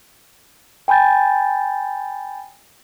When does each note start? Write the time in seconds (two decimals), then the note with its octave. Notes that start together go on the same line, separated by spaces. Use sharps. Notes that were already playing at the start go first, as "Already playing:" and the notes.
0.88 G5 G#5 B5 G6 A6